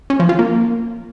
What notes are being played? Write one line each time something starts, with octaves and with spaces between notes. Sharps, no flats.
C#4
F3
F4
A#3